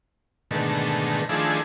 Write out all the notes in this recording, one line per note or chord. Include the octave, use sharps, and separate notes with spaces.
G#2 B2 D3 D#3 A3
D#3 F3 A3 D4 E4 G#4